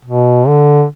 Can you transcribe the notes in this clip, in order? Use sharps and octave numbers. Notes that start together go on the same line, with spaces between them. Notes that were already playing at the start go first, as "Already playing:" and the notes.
B2
D3